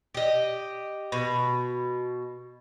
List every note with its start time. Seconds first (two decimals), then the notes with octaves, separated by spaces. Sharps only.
0.15 G4 D#5
1.12 B2